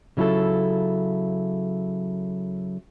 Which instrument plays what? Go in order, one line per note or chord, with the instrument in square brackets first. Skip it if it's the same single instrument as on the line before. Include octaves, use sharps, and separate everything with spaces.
[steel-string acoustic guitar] C#3 F#3 E4 F4 A4